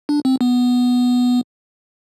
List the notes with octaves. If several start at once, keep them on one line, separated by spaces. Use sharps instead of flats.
D4
C4
B3